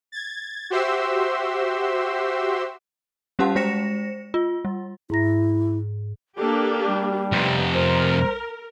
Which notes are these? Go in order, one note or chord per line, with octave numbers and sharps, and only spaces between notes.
G#6 A6
F#4 G4 C5 E5 C6 E6
G3 C#4 G4 F5 F#5 A5
G#3 C5 A#6 C#7 E7
F4
G3
G#2 E4 A#5 A#6
A#3 D4 G4 A4
G3
F2 C3 B3
A#4 C5